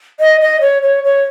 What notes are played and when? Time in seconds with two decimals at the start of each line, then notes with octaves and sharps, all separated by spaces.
0.20 D#5
0.41 D#5
0.61 C#5
0.82 C#5
1.04 C#5